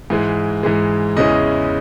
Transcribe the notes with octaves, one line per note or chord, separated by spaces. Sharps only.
G#2 E3 G#3
G#2 E3 G#3
E2 C#3 G#3 C#4 E4 D#5